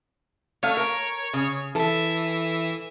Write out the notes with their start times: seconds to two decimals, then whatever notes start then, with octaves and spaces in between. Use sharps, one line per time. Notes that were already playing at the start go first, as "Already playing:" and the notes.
0.63 A3 C#5 F5
0.77 A#4
1.33 C#3
1.75 E3 A4 E5